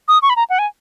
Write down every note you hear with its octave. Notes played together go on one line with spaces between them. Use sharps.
D#6
C#6
B5
A#5
F#5
G#5